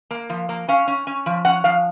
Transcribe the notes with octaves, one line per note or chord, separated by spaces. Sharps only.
A#3
F3
A#3
C#4 F5
C#4
C#4
F3
C#4 F#5
F3 F5